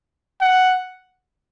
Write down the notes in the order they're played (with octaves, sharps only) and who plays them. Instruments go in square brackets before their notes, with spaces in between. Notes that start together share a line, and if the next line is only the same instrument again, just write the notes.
[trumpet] F#5